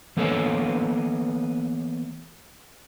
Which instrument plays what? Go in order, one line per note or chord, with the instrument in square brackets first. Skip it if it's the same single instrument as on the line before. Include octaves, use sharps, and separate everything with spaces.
[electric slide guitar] E3 A#3 B3 A4 C#5 F5